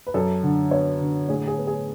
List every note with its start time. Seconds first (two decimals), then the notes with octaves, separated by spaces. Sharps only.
0.07 B4
0.14 F#2 A4
0.43 D3
0.71 B3 C#5
1.00 D3
1.29 A2 G#4
1.48 G#4
1.58 B3
1.67 G#4